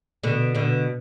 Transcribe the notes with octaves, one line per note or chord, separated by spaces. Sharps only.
B2 D3
B2 D3